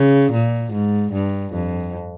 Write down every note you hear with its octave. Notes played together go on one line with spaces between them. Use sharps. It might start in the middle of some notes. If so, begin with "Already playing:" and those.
Already playing: C#3
A#2
G#2
G2
F2